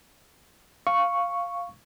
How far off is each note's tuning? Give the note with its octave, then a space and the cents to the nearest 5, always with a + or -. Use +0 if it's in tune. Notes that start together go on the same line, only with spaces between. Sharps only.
F5 +0 C#6 +0